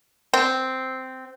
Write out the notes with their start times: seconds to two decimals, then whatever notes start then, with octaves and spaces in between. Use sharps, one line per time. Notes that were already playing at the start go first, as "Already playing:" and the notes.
0.33 C4